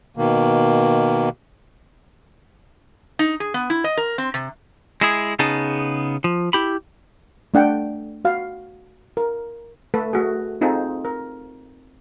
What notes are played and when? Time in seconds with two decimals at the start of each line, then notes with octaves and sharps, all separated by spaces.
0.17 B2 D#3 A#3
3.19 D#4
3.40 G#4
3.54 B3
3.70 E4
3.84 D#5
3.97 A#4
4.18 C4
4.34 C3
5.01 G#3 E4 G#4
5.39 C#3 B3 D#4 G#4 A5
6.24 F3
6.53 E4 G4 B5
7.54 A3 D4 F#5 G5
8.25 F#4 F5
9.17 A#4
9.94 A3 A4 B4
10.13 A3 F#4 G#4
10.61 C4 D#4 F4 G#4 A4
11.05 A#4